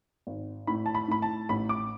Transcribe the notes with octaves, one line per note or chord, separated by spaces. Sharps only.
G#1
A2 B5
A5
B5
A2 B5
A5
A1 B5
D6